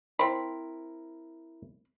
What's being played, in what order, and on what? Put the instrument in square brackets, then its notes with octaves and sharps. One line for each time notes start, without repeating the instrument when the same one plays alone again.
[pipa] C4 B5 [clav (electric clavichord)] E4 A#4